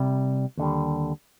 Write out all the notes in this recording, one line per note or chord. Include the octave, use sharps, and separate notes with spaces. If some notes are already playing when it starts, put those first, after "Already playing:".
Already playing: C2 C3 G3
D#2 D3 G3